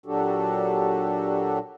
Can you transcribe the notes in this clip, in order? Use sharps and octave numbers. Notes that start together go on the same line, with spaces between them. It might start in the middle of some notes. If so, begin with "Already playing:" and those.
A#2 F#3 D4 F#4 G4 A4